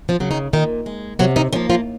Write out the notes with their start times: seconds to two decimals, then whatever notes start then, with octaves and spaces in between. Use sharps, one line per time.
0.09 F3 F4
0.20 C#3 F#3
0.31 D#3 D#4
0.53 A#2 D#3 D#4
0.86 G#3
1.19 C3 F#3 F#4
1.36 D#3 D#4
1.53 F3 A#3 C#4
1.70 F3 F4